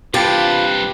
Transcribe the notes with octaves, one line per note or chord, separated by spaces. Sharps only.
G2 C3 F4 G4 B4 A5